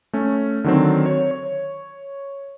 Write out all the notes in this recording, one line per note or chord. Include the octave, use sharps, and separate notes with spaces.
A3 C#4
D3 D#3 F#3 C4
C#5
C#5